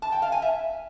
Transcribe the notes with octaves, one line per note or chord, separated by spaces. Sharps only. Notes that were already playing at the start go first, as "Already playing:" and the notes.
A5
G5
F5
G#5
E5